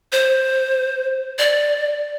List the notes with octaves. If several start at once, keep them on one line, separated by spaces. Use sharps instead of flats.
C5
D5